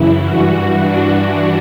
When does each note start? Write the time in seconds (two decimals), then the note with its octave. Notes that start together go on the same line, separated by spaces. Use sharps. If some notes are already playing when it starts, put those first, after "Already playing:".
Already playing: F#2 C#3 E3 E4
0.23 G2 E3 F#4
0.80 D4